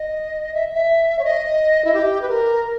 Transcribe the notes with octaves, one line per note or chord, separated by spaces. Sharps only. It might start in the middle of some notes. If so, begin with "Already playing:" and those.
Already playing: D#5
E5
E5
C#5
D#5
E4
G4
B4
A#4